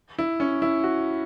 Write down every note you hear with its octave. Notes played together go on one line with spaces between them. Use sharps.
E4
C#4
E4
F#4